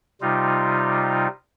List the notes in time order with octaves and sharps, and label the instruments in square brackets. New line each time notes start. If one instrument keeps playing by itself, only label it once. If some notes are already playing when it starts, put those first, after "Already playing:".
[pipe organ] C3 G3 D#4 F4